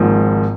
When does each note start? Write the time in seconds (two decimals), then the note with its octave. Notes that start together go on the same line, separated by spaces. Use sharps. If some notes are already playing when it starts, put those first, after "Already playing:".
Already playing: G#1 G#2 F3 A#3